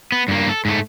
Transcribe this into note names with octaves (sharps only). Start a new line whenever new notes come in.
B3
G2 A#3
A4
G#2 A3